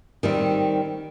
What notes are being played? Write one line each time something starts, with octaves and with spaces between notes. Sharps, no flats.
D#3 G3 C4